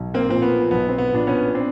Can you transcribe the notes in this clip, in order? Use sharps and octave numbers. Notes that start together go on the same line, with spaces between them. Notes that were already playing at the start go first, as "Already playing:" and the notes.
Already playing: B1
A#3 C4
A#2 F3 C4
B3
B1 B3
C4
B3
A#2 F3 D4
B3 C#4
C4 D4